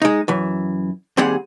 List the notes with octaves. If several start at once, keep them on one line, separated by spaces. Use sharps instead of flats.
G#3 D#4
F#2 E3
D#2 G3 C4 G4 G#4 F#5